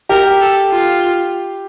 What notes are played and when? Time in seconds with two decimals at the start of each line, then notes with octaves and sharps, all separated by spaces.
0.09 G4 A#4
0.41 A4
0.71 F4